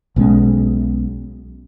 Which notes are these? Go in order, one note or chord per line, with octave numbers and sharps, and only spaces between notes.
B1 B2 G#3 C#4